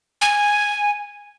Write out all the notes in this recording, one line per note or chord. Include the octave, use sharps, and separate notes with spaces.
G#5